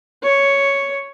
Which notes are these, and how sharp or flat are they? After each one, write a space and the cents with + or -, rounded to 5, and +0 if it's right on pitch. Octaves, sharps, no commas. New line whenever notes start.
C#5 +5